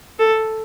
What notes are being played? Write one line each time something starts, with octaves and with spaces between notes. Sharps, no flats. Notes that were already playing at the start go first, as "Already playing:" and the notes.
A4